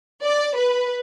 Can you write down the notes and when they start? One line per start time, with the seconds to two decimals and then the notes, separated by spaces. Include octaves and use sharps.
0.23 D5
0.56 B4